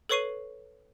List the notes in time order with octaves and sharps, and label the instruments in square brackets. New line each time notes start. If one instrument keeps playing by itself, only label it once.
[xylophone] A4 B4 C#5 C#6 C7 D#7